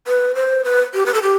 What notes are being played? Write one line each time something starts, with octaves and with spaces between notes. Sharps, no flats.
B4
C5
B4
G4
B4
A4
G4